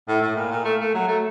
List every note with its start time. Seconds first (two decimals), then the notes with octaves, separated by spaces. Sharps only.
0.09 A2
0.22 A2
0.36 A#2
0.51 A#2
0.65 A3
0.80 A3
0.94 F#3
1.08 A3